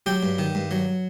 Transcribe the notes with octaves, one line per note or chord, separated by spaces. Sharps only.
F#3 G4 G5
G2
D#3
G2
F#3